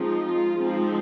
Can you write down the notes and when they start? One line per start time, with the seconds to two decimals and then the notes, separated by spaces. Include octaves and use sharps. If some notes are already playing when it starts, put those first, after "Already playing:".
Already playing: F3 G#3 C4 D#4
0.21 F4
0.56 F3 G#3 C4 D#4